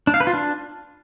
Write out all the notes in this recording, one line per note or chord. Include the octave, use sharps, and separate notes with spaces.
D4
F5
B4
F4
D4